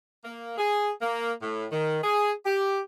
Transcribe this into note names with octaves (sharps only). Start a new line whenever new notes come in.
A#3
G#4
A#3
A2
D#3
G#4
G4